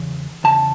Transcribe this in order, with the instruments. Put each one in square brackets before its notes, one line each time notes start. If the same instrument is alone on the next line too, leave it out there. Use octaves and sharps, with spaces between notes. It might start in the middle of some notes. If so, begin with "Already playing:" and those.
Already playing: [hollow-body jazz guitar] E2 C#3
E2 C#3 A5